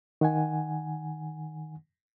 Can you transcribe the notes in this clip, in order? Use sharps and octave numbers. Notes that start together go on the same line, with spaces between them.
D#3 F#5 G#5